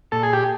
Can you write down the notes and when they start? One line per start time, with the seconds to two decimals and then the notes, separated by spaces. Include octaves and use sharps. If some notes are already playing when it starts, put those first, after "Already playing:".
0.12 A#2 A4
0.23 G#4
0.33 G4